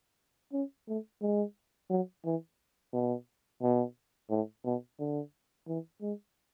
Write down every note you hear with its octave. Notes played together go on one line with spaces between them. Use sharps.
C#4
A3
G#3
F#3
E3
B2
B2
A2
B2
D3
E3
G#3